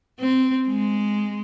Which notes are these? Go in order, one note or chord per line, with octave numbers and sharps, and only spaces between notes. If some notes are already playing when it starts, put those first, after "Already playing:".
C4
G#3